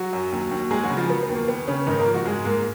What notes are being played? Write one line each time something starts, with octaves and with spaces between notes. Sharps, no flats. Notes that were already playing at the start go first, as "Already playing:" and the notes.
Already playing: F#3 F#4
F#2
D#2
D#2
D#2 G#3 G#4
F#3 F#4
C#3
F3 F4
F#3 B3
B3
D#2
A#3
D#2 B3
C#3 C#4
G#2 D#3 D#4
A#3 A#4
F3
F#4
G#2 G#3 G#4
G#2 A#3 A#4